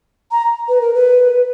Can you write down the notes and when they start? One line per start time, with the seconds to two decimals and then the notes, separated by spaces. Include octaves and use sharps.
0.31 A#5
0.69 B4
0.81 A#4
0.94 B4